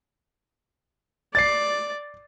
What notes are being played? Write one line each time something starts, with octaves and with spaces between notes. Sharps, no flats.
D5 A6 C7